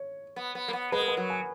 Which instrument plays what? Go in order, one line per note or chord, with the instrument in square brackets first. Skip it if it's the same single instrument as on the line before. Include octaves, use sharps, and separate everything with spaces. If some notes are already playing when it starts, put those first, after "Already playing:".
Already playing: [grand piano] C#5
[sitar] B3
B3
A#3
B3
[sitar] G#3 [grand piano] B4
[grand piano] A#4
B4
[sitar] F#3
[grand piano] G#5